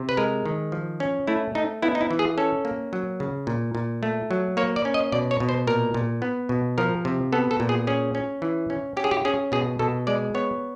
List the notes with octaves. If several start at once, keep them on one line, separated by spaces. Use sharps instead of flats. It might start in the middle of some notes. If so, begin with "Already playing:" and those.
Already playing: C3
B4
G#3 A#4
D#3
F3
C#4
A3 E4
A3 D#4
B3 E4
D#4
E4
E3
G#4
C#4 A4
A#3
F#3
C#3
A#2
A#2
A3
F#3
A#3 C#5
D5
C#4
D#5
B2 D5
C#5
B2
C5
A#2 A#4
A#2
B3
B2
F3 A#4
C3
B3 A4
A4
A#2
G#4
C#4 G#4
C#4
E3
C#4
C#4 G4
G#4
G4
C#4 G#4
B2 G#4
B2 A4
G#3 D5
B3 C#5